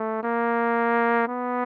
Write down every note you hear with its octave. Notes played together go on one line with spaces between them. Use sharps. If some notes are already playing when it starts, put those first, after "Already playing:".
Already playing: A3
A#3
B3